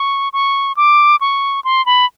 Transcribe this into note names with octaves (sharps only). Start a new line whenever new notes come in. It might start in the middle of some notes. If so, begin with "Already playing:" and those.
Already playing: C#6
C#6
D6
C#6
C6
B5